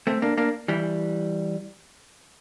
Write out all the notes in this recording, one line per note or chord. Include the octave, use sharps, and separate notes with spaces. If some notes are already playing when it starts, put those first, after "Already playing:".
A3 C4
A#3 D4
A#3 D4
E3 G3